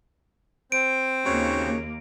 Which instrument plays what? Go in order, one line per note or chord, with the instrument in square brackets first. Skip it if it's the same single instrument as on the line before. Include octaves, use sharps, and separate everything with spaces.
[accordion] C4 C5 [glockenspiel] D7
[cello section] D#2 A#3 [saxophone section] C#3 F#4 C#5